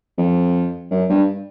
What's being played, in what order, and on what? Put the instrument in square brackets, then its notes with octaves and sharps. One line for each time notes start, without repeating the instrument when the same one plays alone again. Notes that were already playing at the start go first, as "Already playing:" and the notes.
[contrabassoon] F2
F#2
G2